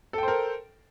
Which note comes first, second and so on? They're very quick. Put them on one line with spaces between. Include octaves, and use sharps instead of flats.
A4 G5 C5 A#4